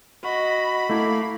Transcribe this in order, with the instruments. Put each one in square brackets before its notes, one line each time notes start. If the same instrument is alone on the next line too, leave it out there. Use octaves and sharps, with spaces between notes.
[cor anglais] F#4 [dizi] D#5 [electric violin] B5
[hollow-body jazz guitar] A3 E4 [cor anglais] A#3 [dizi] F5